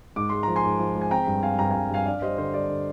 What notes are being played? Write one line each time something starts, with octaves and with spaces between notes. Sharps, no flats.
G#2 D6
G#3 C6
F3 A#5
G#5 C6
G#2
F3
G#3
G#5
C4 G5 A#5
G2
C4 F5 G#5
G2 G5 A#5
F5 G#5
G2
G2 F5 G#5
D4 D5 F5
G3 C5 D#5
D3 C5
G3 D5
D3